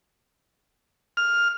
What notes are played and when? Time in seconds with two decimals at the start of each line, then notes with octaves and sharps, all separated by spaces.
1.17 F6